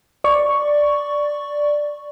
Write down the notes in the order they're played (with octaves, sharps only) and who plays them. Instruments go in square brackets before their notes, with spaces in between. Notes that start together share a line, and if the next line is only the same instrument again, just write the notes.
[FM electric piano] D5 C#6